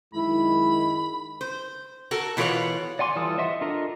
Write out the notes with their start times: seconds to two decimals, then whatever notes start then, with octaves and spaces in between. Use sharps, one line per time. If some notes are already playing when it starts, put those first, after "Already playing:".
0.14 F#2 D#3 G#3 E4 B5
1.41 C5
2.11 F#4 A4 A#4
2.37 B2 E3 F4 B4 C#5 F#5
2.99 D5 F#5 G#5 C6 D6
3.16 E3 G3 F4 A4 D#6
3.38 C5 D#5 E5 F#5 C6
3.61 D4 F4 A4 A#4 D#5